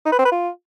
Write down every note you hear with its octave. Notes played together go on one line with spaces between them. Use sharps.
D#4
B4
C4
B4
F4